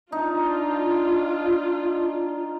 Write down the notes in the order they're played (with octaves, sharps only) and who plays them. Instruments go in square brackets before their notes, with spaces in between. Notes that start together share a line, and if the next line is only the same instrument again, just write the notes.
[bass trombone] D4 [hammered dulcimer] D#4 [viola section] F4